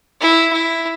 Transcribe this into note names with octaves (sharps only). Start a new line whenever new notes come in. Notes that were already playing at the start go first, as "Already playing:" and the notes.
E4
E4